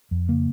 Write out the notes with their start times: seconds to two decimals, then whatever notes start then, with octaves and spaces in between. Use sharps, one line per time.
0.11 F2
0.28 C#3 A#3